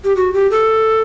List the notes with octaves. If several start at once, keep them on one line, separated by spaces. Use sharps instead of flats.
G4
F#4
G4
A4